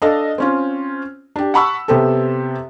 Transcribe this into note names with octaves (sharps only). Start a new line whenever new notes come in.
D4 A4 D#5 F5
C4 C#4 F4
D4 G4
F#5 A5 B5 C#6 E6
C3 B3 C4 G4 A4